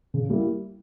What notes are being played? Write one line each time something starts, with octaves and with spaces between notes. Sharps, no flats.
C#3
G3 A#3 E4